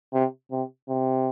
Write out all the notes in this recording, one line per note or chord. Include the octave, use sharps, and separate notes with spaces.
C3
C3
C3